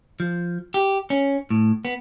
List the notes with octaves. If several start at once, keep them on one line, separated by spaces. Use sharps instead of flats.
F3
G4
C#4
A2
B3